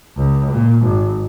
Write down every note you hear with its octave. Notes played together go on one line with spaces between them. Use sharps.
C#2
A#2
G#1